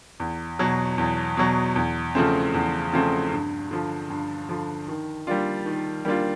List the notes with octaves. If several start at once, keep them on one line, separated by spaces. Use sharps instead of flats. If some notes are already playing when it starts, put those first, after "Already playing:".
E2
B2 F#3
E2
B2 F#3
E2
C#3 F3 A3 C4
E2
C#3 F3 A3 C4
G2
D3 F3
G2
D3 F3
D#3
G3 A#3 D4 F4
D#3
G3 A#3 D4 F4